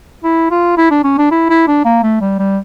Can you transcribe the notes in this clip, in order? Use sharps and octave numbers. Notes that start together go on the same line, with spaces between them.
E4
F4
E4
D4
C#4
D4
E4
E4
D4
A#3
A3
G3
G3